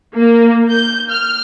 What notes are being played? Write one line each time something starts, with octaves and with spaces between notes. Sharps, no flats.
A#3
G6
F6